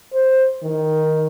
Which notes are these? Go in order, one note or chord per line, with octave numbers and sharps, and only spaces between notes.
C5
D#3